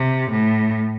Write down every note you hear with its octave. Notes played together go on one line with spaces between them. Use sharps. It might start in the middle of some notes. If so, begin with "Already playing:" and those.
Already playing: C3
A2